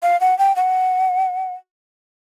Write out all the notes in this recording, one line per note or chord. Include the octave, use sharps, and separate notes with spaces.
F5
F#5
G5
F#5